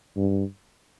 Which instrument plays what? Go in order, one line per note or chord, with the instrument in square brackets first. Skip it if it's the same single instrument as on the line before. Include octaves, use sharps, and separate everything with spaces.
[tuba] G2